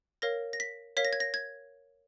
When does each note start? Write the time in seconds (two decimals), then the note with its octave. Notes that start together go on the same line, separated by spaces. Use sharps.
0.22 A#4 C#5 F5 A#6
0.53 A#6
0.60 B6
0.97 A#4 C#5 F5 B6
1.05 A#6
1.13 G#6
1.20 A#6
1.34 G#6